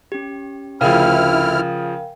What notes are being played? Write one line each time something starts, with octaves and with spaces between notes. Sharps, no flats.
C#4 G4
D2 C#3 F3 E4 A#4 F5 G5 F6